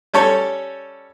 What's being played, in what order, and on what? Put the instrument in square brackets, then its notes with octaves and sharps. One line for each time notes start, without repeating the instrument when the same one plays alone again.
[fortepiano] G3 C#4 A4 C#5